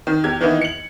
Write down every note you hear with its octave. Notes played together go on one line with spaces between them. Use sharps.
D#3
E2 G4 G#6
D#3 E3 A#3 B3 D#4 E4
C#7 F#7